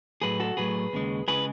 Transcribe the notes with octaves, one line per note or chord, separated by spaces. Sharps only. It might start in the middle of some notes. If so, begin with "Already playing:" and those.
A2 F#3 A3 G#4 B4
F#4 A4
A2 F#3 A3 G#4 B4
D#2 C#3 G#3
C#3 G#3 G#4 B4